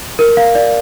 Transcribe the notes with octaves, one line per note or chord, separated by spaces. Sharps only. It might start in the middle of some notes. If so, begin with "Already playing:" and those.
A#4
F5
D5